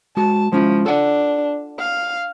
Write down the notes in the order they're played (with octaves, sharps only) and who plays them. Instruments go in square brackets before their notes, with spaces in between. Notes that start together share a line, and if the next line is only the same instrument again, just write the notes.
[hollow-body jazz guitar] G#3 F#4 [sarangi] A5
[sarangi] F3 [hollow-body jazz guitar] G#3 C#4 E4
[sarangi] D4 [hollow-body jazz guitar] A4 F#5
[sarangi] F5